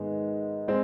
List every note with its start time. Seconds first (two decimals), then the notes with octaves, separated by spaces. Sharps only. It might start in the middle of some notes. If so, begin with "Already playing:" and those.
Already playing: G#2 D#3 G#3 B3
0.68 G#3 C4